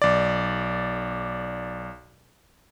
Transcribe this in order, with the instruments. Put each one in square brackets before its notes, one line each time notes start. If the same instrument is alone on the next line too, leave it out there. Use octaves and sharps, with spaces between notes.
[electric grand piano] B1 D5